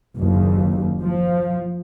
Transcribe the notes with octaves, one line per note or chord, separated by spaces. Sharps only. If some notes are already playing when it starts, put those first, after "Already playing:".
F#1 D#2
F3